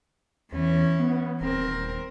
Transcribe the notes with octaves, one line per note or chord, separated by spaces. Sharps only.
E2 E3 C#4
B3
D#1 C4 A#4